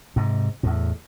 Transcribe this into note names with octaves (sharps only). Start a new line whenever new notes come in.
G#2 C3
E2 A2